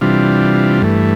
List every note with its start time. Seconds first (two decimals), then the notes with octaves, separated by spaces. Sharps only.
0.01 C3 E3 G3 D4 F4
0.82 G2 E3 A3